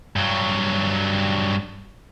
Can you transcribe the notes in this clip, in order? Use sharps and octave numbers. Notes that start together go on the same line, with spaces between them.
G2 F#3